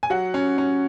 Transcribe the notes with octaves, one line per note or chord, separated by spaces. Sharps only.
G#5
F#3 F#5
C#4
C#4